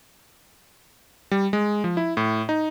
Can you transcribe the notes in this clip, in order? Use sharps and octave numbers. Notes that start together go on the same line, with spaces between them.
G3
G#3
F3
E4
A2
D#4